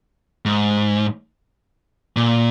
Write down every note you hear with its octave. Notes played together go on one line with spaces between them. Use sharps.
G#2
A#2